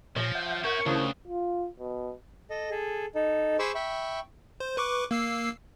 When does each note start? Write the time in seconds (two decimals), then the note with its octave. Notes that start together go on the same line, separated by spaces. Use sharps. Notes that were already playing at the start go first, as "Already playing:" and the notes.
0.16 A#2 F3 C#5 G#5 A#6
0.35 E5 F#5 G6
0.64 C#4 F#4 A#4 C#6 G#6
0.86 D2 C#3 E4 C5 C#5 A5 C#6 D#6
1.27 F4
1.79 B2
2.50 A4 D#5
2.71 G#4 A4
3.15 D#4 A4
3.59 G#4 C5 B5 C#6 D6 E6
3.75 E5 G5 B5 C#6
4.60 C5
4.77 B4 C#6 D6
5.11 A#3 E6 C7